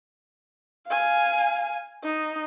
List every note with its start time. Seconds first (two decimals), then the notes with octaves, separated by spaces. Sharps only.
0.88 F5 G#5
2.04 D#4